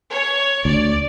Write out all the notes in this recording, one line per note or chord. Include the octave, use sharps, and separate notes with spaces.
C#5
D2 D5